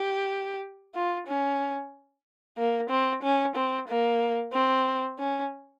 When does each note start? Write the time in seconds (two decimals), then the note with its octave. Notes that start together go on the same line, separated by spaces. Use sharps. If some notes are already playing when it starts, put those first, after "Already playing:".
Already playing: G4
0.95 F4
1.27 C#4
2.58 A#3
2.90 C4
3.23 C#4
3.56 C4
3.88 A#3
4.53 C4
5.19 C#4